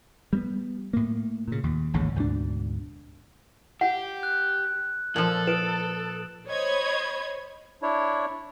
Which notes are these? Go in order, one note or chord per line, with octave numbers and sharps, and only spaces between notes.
G3 A#3 B3
A2 A#3
A#2 C#3
D#2
A1 D#2 G#2 C#3
D2 G#2 B2 D4
G4 F#5
F#6
A#2 F3 A4 F#7
B4 D#6 D7 E7
C5 C#5 D#5 B5 G#6
D4 E4 C#5